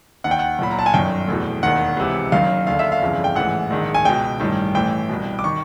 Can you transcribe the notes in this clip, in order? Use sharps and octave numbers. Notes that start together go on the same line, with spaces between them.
D#2 D#3 F#5
G5
F#5
B1 A#2 B5
A#5
A5
G#5
G1 F#2 D#3 G5
F1 E2 B2
E1 D#2 D#3 F#5
C#2 C3 E3
F#1 F#2 D#3 F5
D#2 D3 F5
E5
F5
G1 F2 C#3 E3
G5
A1 G#2 E3 F#5
A#1 G#2 D#3
G#5
C#2 B2 G5
A1 G2 D#3
A1 A2 E3 G5
C2 B2
D6
D#3 C#6